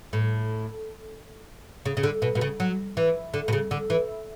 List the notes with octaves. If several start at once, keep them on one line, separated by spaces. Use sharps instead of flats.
A2
C#3
C#3
D3
B2
B2
C#3
F#3
E3
D3
B2
C#3
D3
E3